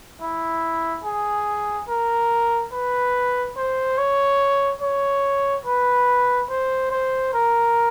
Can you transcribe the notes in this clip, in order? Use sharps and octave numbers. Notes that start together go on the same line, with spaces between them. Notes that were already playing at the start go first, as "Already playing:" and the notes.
E4
G#4
A#4
B4
C5
C#5
C#5
B4
C5
C5
A#4